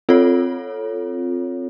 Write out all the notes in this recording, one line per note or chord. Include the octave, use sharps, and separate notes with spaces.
C4 F4 A4 C#5